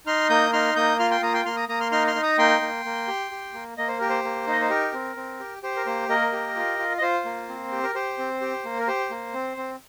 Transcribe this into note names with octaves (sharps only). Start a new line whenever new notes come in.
D#4 C6 F6
A#3 D#6 G6
D#4 C6 F6
A#3 D#6 G6
F4 C6 F6
G5 C6
A#3 A#5 D#6
G5 C6
A#3 C6 F6
A#5 D#6
A#3 A#5 D#6
C6 F6
D#4 C6 F6
C6 F6
D#4
A#5 D#6
A#3 G5 C6
A#3
A#3
G4
G4
A#3
A#3 D#5
C5
G4 A#4
C5
A#3
D#4 D#5
C5
G4 A#4
C4
C4
G4
G4 C5
A#4
A#3 C5
A#3 A#4 D#5
G4
F4
F4
D#5
F4 C5
A#3
C4
G4
A#4
G4 C5
C4
G4
A#3
A#4
G4 C5
A#3
C4
C4